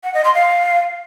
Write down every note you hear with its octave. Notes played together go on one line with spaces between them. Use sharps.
F#5
D#5
C6
F5